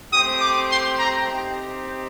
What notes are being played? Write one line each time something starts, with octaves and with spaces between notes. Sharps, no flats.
A3 C4 G4 D#6
D6
C6
A#5
C4 D#4 G4